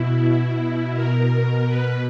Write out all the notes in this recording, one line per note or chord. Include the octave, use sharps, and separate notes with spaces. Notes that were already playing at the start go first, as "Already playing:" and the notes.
Already playing: B2 E4
A#4
B4